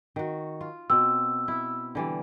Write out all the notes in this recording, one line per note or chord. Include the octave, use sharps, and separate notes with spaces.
D#3 F#4
F4
B2 C4 E6
E4 E5
D3 E3 G3